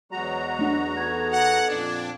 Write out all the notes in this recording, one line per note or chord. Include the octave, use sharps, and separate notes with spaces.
E2 F#3 G#3 F#4 A#5
A3 D4
B3 D#4 A4 G#6
F#5
F2 A#2 D4